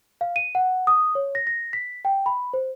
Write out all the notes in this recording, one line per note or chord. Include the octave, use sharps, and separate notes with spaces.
F5
D#7
F#5
D#6
C#5
A#6
A#6
B6
G5
B5
C5